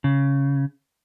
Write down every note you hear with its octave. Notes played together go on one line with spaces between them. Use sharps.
C#3